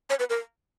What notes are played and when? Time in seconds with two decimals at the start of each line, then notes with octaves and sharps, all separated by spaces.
0.10 C#5
0.19 B4
0.30 A#4